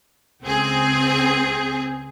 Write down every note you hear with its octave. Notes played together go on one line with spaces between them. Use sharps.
C#2 C4 G#4